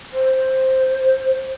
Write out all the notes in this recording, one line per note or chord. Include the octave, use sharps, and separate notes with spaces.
C5